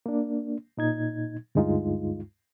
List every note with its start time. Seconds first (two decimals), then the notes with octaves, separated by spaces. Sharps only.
0.06 A#3 D4
0.77 A#2 D#4 G#6
1.55 D2 G2 G#3 D#4 F4